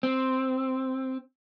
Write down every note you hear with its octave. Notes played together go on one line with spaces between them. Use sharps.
C4